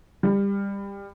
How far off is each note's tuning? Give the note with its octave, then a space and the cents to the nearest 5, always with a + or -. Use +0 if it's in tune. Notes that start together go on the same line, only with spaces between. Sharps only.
G3 +20